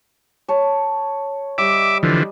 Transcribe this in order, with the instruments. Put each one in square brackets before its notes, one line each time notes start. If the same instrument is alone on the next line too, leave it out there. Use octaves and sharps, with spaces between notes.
[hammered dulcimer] C#5 A5
[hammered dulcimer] G3 D#5 [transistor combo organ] E5 D6
[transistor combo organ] D3 E3 F3